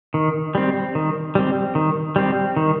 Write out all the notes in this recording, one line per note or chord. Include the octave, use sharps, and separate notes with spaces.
D#3
G3 C4
D#3
G3 C4
D#3
G3 C4
D#3